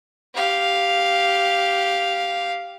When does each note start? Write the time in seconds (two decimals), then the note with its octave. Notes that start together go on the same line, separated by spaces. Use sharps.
0.34 G4 F5